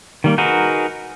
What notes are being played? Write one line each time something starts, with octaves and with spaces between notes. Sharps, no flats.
D#3 G3 A#3
D#4 F#4 G#4 A#4 B4